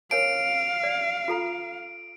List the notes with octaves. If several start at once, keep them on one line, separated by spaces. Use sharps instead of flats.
A#4 C#5 F5 G#5 D7
D5
F4 A4 A#5